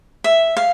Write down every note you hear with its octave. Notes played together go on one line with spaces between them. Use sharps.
E5
F5